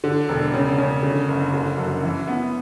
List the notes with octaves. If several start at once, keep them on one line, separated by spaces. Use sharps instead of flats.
D3
E1
C#3
C#3
D3
F#1
D3
F#2
E3
B3